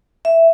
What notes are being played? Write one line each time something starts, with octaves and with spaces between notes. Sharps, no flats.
E5